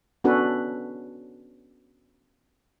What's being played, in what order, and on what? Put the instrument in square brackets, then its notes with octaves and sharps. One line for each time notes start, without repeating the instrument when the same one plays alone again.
[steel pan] B3 C#4 D4 F#4 A4 B4